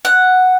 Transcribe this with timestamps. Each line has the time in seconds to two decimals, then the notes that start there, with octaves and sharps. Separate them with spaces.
0.05 F#5